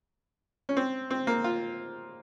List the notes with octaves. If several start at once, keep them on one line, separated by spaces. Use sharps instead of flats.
C#4
C4
C4
A#3
F4